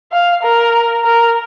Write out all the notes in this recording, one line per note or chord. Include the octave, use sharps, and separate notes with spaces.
F5
A#4
A#4